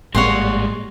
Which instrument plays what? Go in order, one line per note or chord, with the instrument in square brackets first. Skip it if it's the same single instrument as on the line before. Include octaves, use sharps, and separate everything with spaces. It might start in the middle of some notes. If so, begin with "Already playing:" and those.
[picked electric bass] G#1 A2 A#3 [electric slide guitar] G3 G#3 [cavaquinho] C#5 F#5 C6